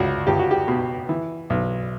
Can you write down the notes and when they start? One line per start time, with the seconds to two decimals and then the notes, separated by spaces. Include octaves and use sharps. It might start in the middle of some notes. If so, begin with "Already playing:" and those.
Already playing: C#2 F#4
0.27 C#2 G4
0.39 F#4
0.51 G4
0.68 B2
1.09 E3
1.50 B1